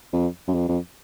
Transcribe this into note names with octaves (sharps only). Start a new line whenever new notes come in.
F2
F#2
F2
F2